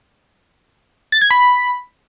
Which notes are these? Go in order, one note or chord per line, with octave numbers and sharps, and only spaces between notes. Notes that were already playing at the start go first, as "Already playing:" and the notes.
A6
G#6
B5